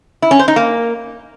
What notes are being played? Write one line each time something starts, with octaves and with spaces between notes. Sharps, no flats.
E4
C#4
C5
D#4
A#3